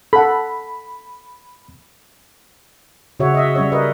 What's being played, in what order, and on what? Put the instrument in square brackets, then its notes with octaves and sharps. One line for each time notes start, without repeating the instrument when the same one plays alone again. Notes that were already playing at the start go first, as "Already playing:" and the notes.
[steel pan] A4 F#5 [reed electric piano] B5
[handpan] C#3 F#4 C#5 E5
D#5 E5
G3 C#4 C#5
A#4 B4 D#5